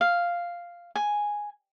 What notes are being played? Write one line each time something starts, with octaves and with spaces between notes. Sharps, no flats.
F5
G#5